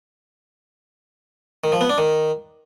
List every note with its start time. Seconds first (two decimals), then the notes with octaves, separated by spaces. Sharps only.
1.64 D#3
1.72 F3
1.81 B3
1.89 D4
1.98 D#3